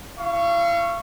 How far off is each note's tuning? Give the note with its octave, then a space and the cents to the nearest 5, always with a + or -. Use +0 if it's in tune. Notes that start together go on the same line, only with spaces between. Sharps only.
E4 +0 F5 -35 C#6 +0